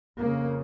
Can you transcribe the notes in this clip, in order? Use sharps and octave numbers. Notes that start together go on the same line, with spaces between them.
F2 C#3 A#3